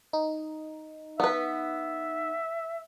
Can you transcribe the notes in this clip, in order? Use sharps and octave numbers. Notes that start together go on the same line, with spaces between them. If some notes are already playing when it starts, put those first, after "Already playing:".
D#4
B3 B4 E5